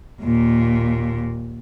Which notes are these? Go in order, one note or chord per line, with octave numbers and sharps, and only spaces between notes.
D#2 A#2